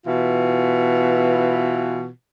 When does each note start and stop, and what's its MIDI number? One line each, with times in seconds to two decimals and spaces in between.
0.06 2.07 47
0.06 2.07 52
0.06 2.07 65